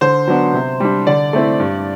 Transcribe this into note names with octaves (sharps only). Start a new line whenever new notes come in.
D3 C5
F#3 B3 D4
C3
G3 D4
D3 D5
A3 C4 E4
G2